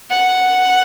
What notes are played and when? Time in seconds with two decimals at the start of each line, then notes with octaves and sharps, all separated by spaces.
0.10 F#5